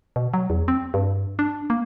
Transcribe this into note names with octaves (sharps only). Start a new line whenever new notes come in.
B2
F#3
E2
C4
G2
D4
A#3